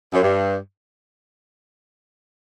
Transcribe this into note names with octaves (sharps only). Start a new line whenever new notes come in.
F#2
G2